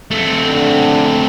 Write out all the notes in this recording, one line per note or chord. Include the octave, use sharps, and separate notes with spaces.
A3 C4
D3